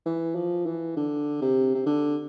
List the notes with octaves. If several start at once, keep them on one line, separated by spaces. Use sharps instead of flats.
E3
F3
E3
D3
C3
C3
D3